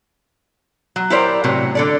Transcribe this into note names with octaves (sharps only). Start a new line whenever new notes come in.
F#3
E4 G4 A#4 C5 D5
A2 C3 F#3
D3 A4 D5